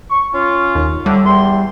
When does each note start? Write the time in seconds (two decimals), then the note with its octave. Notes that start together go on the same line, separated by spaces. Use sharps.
0.10 C#6
0.34 C#4 F4
0.75 D#2
1.06 A2 D3 G3
1.25 E2 G5 C6